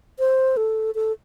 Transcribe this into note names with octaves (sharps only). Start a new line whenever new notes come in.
C5
A4
A4